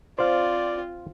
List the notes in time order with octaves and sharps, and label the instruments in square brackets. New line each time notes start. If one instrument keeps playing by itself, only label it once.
[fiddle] C4 F4 [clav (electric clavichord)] C5 F5 [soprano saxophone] D5